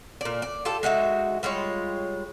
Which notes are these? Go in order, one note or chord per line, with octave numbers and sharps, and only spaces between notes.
A#2 D5
D5
F4 G4 A4
G#3 D#4 F#4 E5
G3 G#3 F4 C#5